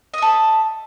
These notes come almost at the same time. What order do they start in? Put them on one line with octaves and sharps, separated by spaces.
D#5 E5 A4